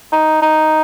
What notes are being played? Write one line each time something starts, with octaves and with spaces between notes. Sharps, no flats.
D#4
D#4